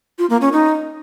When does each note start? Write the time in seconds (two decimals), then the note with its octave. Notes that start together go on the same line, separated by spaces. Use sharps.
0.19 F4
0.30 A#3
0.41 C#4
0.52 D#4